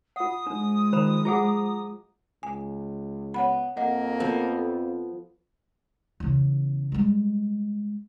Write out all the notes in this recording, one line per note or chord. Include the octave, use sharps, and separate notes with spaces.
F4 F#5 D#6
F3 G#3 D4
D#3 C5 A#5 B5
F4 G#4 F#5 A#5 D6
C#2 G#5
B3 C#5 F#5 B5
F2 A#3 D#5 F#5
F3 B3 A4
E2 C#3
G3 G#3